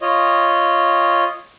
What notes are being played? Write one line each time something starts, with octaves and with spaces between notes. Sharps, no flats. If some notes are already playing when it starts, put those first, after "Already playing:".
F4 C#5 D#5